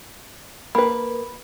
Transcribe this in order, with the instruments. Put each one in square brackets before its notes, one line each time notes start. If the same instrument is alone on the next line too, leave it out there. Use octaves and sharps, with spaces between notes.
[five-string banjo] A#3 B4 [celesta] B5